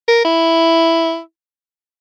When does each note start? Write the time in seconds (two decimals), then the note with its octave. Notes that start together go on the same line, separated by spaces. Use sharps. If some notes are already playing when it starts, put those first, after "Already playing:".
0.08 A#4
0.25 E4